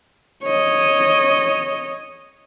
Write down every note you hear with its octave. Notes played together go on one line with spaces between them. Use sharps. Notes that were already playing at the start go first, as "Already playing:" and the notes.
C#5 D#5